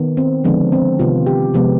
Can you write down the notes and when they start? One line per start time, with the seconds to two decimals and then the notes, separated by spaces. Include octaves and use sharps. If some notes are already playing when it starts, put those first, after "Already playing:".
Already playing: D#3 B3
0.17 C4
0.44 D3 F3 G#3 B3 D4
0.72 C4
0.99 C3 D#3 B3 F4
1.26 G4
1.54 C3 F3 G#3 B3